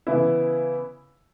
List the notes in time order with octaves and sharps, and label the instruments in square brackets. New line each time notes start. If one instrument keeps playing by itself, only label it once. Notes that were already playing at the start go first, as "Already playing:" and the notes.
[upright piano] C#3 E3 B3 E4